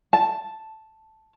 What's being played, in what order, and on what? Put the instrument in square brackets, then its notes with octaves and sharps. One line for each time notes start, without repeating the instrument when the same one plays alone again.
[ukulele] A5